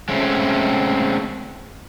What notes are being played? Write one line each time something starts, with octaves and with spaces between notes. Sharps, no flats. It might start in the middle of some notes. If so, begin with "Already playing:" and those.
G#3 A3 C4 C#4